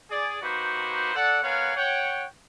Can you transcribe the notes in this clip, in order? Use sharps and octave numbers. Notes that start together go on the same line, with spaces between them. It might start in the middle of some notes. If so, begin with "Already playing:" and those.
G#4 D5
A#3 D#4 F#4 G4 B4 C5
A4 D5 F#5
B3 A#4 C#5 F5 F#5 G#5
C#5 F#5 G5